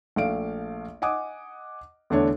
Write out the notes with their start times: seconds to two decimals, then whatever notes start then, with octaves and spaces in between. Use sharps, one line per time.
0.16 A#1 A3 F5 D7
1.02 D#5 F#5 G#5 D6 D#6
2.10 E2 D3 A3 D4 C#5